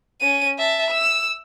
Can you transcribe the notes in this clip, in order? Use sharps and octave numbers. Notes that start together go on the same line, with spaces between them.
C#4 D#7
E5 A5
E6